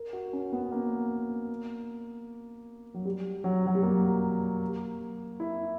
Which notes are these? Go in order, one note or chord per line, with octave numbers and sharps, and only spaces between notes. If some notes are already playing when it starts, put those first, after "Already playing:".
Already playing: A#4
F#4
C#4
B3
A#3
F#3
G3
F#3
F#3
G3
A#3
E4